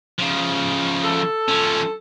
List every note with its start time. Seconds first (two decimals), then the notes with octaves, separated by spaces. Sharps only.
0.19 C#3 F3
1.04 A4
1.48 F3 C#4